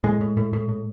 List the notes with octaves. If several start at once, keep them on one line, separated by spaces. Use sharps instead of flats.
A2 G#3
A2
A2
A2
A2